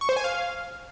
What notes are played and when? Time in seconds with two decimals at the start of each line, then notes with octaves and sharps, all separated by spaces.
0.01 C#6
0.09 C5
0.17 G#5
0.24 F5